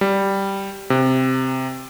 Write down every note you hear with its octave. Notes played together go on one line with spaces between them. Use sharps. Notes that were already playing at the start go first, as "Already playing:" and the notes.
G3
C3